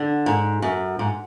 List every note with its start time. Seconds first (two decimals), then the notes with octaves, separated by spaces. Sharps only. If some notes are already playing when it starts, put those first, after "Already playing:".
Already playing: D3
0.26 G#2
0.62 F#2
0.99 G#2